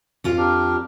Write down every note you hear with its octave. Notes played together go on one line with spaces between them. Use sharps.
F2 F4 F5
D4 G4 A#4